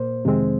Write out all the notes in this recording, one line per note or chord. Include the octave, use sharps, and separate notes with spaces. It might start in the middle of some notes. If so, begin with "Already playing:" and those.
Already playing: A#2 A#3 C5
F2 C3 D#3 G#3 C4